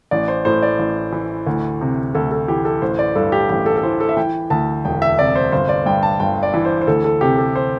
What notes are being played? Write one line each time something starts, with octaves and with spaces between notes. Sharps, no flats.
A1 D5
C5
A2 C5
D5
A1
E3
D2
C3
D2 A4
A4
E3 G4
A4
A1 C5
D5
G2 A4
G4
A1 G4
A4
A4
E3 C5
A4
E5
E3 G5
D2 A5
E1 G5
E5
C3 D5
C5
G1 C5
D5
G2 G5
A5
G1 G5
D5
E3
C5
C5
D2 A4
A4
C3 G4
A4
C5